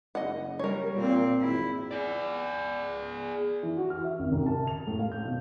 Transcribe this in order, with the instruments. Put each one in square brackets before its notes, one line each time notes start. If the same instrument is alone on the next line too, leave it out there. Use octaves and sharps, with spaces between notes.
[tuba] F#1 [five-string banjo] D#5 F#5
[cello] G3 [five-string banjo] A#4 C#5
[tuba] A#2 [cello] C4
[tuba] G#1 [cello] E4
[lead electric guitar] G#4 D5
[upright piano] E3
F#4
F6
E5
G#1
C2
A5
F7
A2
F5
G6
B2